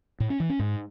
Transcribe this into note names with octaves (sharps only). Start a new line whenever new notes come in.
A2
C#4
E3
C#4
G#2